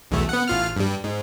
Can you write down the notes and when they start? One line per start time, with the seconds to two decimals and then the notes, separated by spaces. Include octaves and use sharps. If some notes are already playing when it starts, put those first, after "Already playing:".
0.11 B1 E2 A3
0.29 B3 F#5
0.48 A1 F4 F6
0.77 G2 G3
1.04 G#2